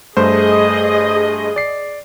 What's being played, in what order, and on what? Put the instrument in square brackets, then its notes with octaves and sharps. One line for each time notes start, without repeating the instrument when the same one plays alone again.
[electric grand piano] G2 A3 C5 [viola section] G#4 D#5
[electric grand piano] D5 C7